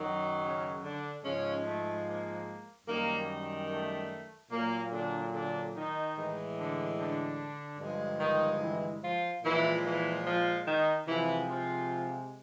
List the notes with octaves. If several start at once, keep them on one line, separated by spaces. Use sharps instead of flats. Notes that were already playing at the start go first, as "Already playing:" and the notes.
Already playing: F#2 D#3 F#3
C#3 C#4
D3 D4
G#2 C#3 F3 G#3 C#4
A3
A#3
F#2 D#3 G3 A#3
A3
A#2 F#3 A#3
D3 D4
D3 D4
D#3 D#4
A2 E3 G#3
D3 D4
D3 D4
G2 D3 F3 G#3
D#3 D#4
E3 E4
F3 F4
A#2 E3 F3 G#3 E4
E3 E4
F3 F4
D#3 D#4
C3 E3 F3 G#3 E4
F3 F4